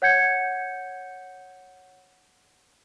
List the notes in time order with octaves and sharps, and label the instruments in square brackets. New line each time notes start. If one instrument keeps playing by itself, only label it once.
[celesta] C#5 F#5 G6 G#6 C#7